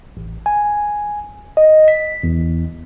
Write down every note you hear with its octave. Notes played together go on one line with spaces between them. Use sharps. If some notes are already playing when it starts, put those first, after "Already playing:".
A1
G#5
D#5
B6
E2